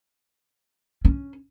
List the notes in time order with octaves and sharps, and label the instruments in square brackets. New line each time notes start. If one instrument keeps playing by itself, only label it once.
[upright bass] C#4